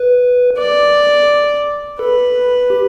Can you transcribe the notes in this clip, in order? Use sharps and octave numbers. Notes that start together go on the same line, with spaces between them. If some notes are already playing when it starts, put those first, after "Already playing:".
Already playing: B4
D5
A4 B4
G4